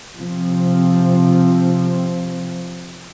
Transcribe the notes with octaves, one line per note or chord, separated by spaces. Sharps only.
C3 F3 C4